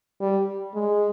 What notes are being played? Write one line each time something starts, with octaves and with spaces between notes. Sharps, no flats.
G3
G#3